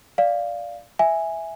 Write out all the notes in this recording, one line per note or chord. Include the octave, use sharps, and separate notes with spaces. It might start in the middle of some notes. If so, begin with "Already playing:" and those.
D5 F5
E5 G#5